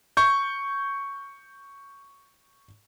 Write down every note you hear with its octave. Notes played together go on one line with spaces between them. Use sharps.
C#6 G6